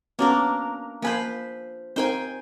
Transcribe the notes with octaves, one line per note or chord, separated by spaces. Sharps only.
A#3 B3 C#4 D4 F#4 A#4
F3 A#3 B4 C5 G#5
C4 D#4 A#4 C5 G5 G#5